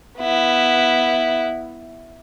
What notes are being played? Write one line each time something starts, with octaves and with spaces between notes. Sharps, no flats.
B3 E4